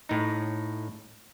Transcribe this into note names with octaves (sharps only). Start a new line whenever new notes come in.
A2 D#4